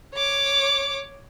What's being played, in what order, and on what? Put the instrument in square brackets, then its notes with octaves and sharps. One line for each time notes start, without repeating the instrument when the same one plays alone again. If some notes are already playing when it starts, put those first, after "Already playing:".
[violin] C#5 D6